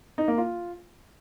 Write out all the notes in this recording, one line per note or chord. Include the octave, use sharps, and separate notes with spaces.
D#4
A#3
F4